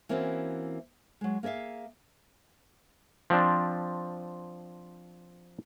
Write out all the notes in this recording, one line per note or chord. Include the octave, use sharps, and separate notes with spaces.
E3 A#3 C4 C#4 E4 F#4
F#3 G#3
A#3 G#4 D5 E5 F5
F3 C4 D4